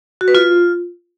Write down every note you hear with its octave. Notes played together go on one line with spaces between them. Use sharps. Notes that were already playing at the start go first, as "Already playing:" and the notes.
F#4
B4
F4